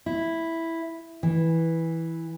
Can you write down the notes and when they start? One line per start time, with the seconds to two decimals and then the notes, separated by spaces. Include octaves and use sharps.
0.06 E4
1.23 E3